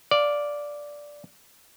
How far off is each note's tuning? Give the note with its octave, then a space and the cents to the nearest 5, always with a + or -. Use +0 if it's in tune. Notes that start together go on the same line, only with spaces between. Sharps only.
D5 -5 F5 +0